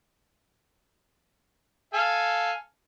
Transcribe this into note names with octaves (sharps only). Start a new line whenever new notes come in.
A4 F5 G#5